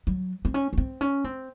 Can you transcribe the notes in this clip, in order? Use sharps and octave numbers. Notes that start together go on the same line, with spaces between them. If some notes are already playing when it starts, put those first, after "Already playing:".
F#3
C4
C#4
C#4
C4
C#4
C4